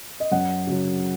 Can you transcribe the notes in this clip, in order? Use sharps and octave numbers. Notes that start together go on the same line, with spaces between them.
D#5
F#2 F#5
C#3 F#3